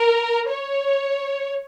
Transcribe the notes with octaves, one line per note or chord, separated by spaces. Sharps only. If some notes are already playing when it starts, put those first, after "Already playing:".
Already playing: A#4
C#5